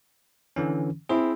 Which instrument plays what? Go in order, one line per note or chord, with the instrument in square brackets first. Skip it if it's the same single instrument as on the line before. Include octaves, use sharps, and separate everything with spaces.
[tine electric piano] D3 E3 C#4
[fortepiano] C4 E4 [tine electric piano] G#4